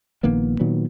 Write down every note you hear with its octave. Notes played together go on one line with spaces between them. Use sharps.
A#1 D#3 A#3 B3
A#2 D#3 F#3 B3